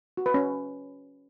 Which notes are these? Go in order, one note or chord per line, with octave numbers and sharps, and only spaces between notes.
F#4
B4
C#4